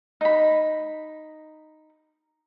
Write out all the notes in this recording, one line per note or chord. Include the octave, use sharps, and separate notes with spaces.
D#4 B5